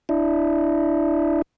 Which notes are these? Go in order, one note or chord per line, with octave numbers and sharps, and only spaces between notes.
D4 E4